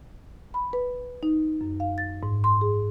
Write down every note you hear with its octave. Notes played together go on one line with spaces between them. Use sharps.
B5
B4
D#4
F#2
F5
A6
G#2
C6
G#4